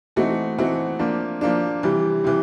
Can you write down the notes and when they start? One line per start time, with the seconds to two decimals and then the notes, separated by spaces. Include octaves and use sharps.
0.16 E3 A3 C4 D#4 F#4
0.58 E3 A3 C4 D#4 F#4
0.99 F3 A#3 D4
1.41 F3 A#3 D4
1.83 C3 E3 G3
2.24 C3 E3